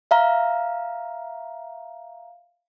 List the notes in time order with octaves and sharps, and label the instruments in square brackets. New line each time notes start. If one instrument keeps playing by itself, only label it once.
[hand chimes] E5 F5 A#5